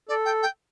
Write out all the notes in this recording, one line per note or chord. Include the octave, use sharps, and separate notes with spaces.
A4 D5
G5
G5